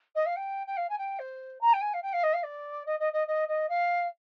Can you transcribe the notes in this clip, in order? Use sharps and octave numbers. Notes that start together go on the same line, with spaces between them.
D#5
F5
G5
G5
F5
G#5
G5
C5
A#5
G5
G#5
F5
G5
F5
D#5
F5
D5
D#5
D#5
D#5
D#5
D#5
F5